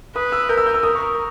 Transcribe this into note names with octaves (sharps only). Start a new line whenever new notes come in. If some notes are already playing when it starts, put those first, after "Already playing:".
B4 D#6
E6
A#4 G6
E6
G6
E6
A#4 D#6
C#6